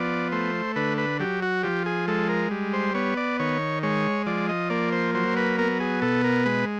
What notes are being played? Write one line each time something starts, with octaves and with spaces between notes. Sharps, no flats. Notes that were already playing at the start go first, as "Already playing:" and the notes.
Already playing: F3 B3 D5
A3 C5
D3 B4
B4
F#3 G4
F#4
F3 G4
G#4
G#3 A4
A#4
G3
C5
B3 C#5
D5
D#3 C#5
G#3 C#5
F3 D5
D#5
A#3 D5
C5
F#3 C5
B4
B3 A#4
G#4
B2 A4
A#4
G#3 B4